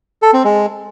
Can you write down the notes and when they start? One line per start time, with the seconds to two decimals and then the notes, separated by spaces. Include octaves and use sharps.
0.22 A4
0.33 C4
0.44 G#3